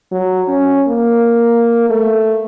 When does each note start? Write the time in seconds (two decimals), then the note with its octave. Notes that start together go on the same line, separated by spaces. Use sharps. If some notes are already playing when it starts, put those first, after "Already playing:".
0.12 F#3
0.48 C#4
0.88 A#3
1.90 A3